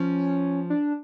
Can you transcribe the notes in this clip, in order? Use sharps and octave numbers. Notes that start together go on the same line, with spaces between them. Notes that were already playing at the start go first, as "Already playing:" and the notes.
Already playing: F3 C#4
D4